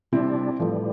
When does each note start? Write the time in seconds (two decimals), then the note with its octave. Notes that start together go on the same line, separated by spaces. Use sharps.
0.12 C3 G3 C4 D4 E4
0.60 A2 E3 F3 G3 A3